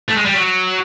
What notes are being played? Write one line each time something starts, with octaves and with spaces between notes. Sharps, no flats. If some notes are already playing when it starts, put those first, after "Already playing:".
A3
G#3
G3
F#3